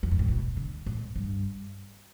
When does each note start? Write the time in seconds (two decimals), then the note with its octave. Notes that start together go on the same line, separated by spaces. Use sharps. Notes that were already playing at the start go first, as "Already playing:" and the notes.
0.03 E2
0.12 G2
0.19 A2
0.28 B2
0.57 D3
0.86 A2
1.16 G2